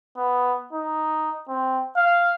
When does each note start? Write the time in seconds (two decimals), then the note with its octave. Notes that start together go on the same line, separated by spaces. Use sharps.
0.17 B3
0.73 D#4
1.49 C4
1.97 F5